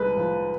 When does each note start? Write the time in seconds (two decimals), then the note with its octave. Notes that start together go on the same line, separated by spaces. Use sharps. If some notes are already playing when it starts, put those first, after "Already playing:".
Already playing: C2 G#3 B4
0.17 F3